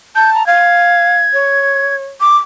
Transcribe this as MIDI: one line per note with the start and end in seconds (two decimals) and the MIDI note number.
0.15 0.46 81
0.15 0.30 91
0.34 0.46 82
0.47 1.17 77
0.47 1.95 92
1.33 2.04 73
2.21 2.37 86